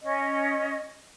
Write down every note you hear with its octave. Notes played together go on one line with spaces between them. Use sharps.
C#4 D#5